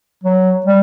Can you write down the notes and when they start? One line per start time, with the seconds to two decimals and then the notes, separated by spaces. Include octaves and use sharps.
0.24 F#3
0.66 G3